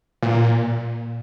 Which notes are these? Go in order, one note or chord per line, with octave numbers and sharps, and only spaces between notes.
A#2